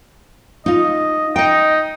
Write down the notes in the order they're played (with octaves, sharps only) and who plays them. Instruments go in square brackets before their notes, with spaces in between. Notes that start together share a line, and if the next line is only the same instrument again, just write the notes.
[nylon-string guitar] D#4 F4 [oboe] D#5
[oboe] D#4 [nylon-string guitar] D#5 G5